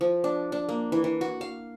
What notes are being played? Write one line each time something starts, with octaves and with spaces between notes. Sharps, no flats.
F3
D4
D4
A#3
E3
E3
F#4
F5